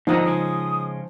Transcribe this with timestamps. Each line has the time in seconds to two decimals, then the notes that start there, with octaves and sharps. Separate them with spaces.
0.07 G#2 D3 D#3 F3 D#4 D#5 F#5
0.26 C#3 G#3 D#6